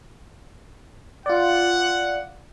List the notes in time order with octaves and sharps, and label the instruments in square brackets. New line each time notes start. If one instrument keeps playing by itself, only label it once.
[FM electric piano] F4 D5 [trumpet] F#5